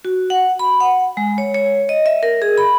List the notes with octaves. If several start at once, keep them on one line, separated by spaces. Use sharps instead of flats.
F#4
F#5
B5
F#5
G#3
C#5
C#5
D#5
E5
A#4
G#4
B5